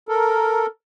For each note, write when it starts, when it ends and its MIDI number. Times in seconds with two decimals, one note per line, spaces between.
0.08 0.66 69
0.08 0.66 70